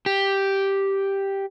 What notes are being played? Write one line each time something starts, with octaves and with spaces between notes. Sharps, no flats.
G4